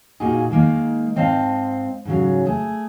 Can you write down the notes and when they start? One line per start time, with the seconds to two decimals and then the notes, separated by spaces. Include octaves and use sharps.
0.20 A#2 A#3 D#4 F#4 G#4
0.51 D#3 G#3 A#3 D#4
1.16 G#2 C4 D#5 F5 A5
2.05 G#2 C#3 F#3
2.45 A3 G#4